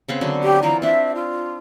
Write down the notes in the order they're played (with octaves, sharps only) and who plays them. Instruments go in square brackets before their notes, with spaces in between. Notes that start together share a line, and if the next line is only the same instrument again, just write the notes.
[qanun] C#3 B3 C4
D3 F#3
[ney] G4
[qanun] E3 C4 F4 [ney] A#5
[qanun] C4 D4 [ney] E5
[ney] F4